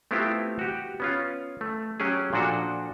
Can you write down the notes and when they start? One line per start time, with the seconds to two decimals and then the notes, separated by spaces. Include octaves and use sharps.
0.11 A3 B3 C4 E4 F4 G4
0.59 F#4 G4
1.00 B3 C#4 F4
1.61 A3
2.00 F#3 C#4 G4 G#4
2.33 A#2 F3 D4 F#4 A4